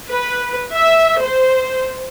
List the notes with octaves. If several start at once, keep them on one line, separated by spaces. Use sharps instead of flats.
B4
E5
C5